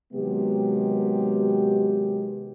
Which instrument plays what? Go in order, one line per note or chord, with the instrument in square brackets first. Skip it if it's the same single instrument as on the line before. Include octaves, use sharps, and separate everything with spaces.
[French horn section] C3 D#3 F#3 G#3 B3 G4